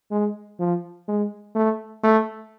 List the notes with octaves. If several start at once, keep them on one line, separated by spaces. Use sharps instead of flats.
G#3
F3
G#3
A3
A3